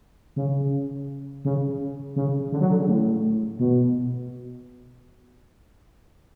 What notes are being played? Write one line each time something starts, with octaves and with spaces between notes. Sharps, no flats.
C#3
C#3
C#3
D3
F#3
D3
C#3
A2
B2